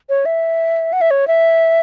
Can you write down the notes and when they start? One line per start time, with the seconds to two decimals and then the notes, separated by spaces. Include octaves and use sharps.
0.09 C#5
0.25 E5
0.93 F#5
1.01 E5
1.11 C#5
1.27 E5